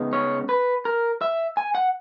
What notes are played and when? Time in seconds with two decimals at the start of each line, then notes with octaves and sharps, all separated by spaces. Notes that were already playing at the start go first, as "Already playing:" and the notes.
Already playing: C#3 G#3 B3 D#4
0.13 C#5
0.49 B4
0.85 A#4
1.21 E5
1.57 G#5
1.75 F#5